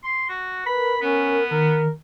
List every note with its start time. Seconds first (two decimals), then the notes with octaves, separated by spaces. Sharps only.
0.04 C6
0.29 F#4
0.66 A#4 B4 B5
1.02 B3 C#4
1.51 D#3 A#4